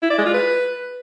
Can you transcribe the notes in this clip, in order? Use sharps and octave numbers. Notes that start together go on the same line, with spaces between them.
E4
D5
G#3
F4
B4